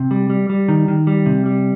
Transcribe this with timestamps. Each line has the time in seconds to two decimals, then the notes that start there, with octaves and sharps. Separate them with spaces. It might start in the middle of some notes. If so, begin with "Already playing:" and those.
Already playing: C3
0.11 G3
0.30 G3
0.50 G3
0.68 D#3
0.88 D#3
1.07 G3
1.26 C3
1.46 G3